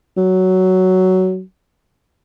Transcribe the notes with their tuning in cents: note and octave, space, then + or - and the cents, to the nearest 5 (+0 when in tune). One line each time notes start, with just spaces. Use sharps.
F#3 +10